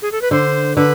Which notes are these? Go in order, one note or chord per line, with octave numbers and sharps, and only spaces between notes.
G#4
A4
B4
D3 C5
D3 B4